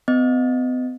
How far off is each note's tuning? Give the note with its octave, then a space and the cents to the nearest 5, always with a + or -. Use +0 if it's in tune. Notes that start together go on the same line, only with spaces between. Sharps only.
B3 +45 D#5 +0